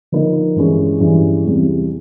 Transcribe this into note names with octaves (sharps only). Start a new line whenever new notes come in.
D3 F3 A#3 D#4
G2 E3 G#3 C#4
G2 E3 G#3 C#4
E2 C3 E3 G3